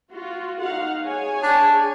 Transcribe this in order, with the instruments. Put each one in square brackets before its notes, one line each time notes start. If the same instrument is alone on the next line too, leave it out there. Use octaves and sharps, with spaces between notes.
[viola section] F4 F#4
D#4 F5 F#5
G#4 C#5 G#5
[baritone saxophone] D4